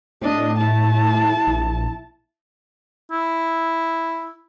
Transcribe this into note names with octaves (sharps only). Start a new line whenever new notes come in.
A2 D4 D#5
E4 A5
A#1
E4